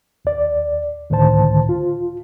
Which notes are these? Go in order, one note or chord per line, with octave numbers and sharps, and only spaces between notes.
D#2 D5
C#2 A2 D3 D#3 C5 A5
F4